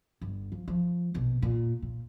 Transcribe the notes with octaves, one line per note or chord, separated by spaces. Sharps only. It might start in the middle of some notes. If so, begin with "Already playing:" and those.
G1
F3
F3
A#1 B2
A#2
A#2